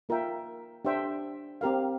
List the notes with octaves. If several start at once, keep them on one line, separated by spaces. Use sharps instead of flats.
A#3 F4 A#4 E5 G5
D4 G4 C5 E5 G5
C4 G4 A#4 F5